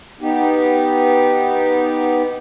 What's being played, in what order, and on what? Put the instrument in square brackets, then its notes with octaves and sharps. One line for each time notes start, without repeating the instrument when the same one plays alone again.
[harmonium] B3 D#4 G4